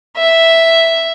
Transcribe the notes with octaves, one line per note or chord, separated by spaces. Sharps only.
E5